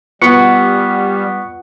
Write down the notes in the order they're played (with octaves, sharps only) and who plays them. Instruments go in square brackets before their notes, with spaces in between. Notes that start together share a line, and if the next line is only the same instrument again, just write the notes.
[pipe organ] G3 [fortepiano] B3 [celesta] F4 F#5 [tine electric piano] C#6 C#7